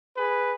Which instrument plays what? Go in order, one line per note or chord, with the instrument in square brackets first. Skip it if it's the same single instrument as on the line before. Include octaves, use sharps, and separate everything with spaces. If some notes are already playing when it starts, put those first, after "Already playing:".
[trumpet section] G#4 B4